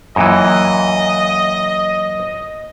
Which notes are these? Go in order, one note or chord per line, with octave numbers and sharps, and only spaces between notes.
F#2 A#2 E3 D#5